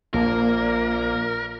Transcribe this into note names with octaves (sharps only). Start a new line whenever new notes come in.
A#1 A#2 A#3 A#4